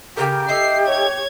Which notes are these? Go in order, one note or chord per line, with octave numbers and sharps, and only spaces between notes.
C#3 G4 A#4
A3 D#4 E5 C7
C#5 G#6